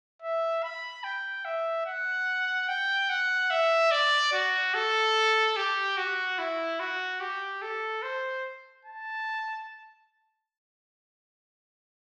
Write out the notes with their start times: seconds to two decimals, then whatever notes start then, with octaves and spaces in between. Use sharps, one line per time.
0.22 E5
0.63 B5
1.04 G5
1.45 E5
1.86 F#5
2.68 G5
3.09 F#5
3.50 E5
3.91 D5
4.32 F#4
4.74 A4
5.56 G4
5.97 F#4
6.38 E4
6.80 F#4
7.20 G4
7.62 A4
8.03 C5
8.85 A5